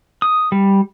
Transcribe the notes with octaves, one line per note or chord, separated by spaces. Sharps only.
D#6
G3